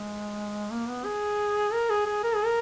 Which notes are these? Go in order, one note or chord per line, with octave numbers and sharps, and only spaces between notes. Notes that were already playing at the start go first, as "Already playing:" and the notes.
Already playing: G#3
A#3
B3
G#4
A#4
G#4
G#4
A#4
G#4
A#4